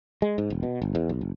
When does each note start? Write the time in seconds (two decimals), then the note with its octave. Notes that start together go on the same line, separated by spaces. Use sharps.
0.22 G#3
0.38 G#2
0.50 E1
0.63 B2
0.82 G1
0.95 E2
1.09 B1
1.21 F#1